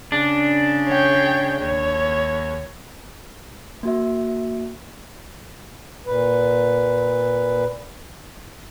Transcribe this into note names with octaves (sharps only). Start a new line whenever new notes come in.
C#3 D4
C#5 G5
D#2 C#5
A#3 F#4 E5
A#2 B4